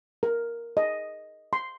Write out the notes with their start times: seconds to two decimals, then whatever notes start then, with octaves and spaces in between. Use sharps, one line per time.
0.23 A#4
0.77 D#5
1.53 C6